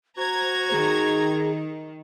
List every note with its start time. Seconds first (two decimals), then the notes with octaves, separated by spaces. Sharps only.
0.18 F#4 C5 A#5 G#6
0.71 D#3 G#4